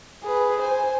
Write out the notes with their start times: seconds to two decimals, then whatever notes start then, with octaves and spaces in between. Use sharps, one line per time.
0.23 G#4 B4
0.60 C5 G#5